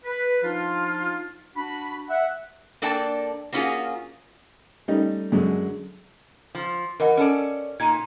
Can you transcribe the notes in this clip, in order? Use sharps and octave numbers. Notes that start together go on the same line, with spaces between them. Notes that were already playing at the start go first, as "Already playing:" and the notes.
B4
F3 D4 D#4 F4
D4 F#4 B5
E5 F#5
A#3 D4 A4 D5 G5 A5
A#3 B3 C#4 F4 F#4 G#4
G3 A3 C#4 D#4
F#2 D3 F#3 G#3
F3
E3 A#4 D#5 F#5
C#4 A4 D5
A#2 D#4 G#6 D#7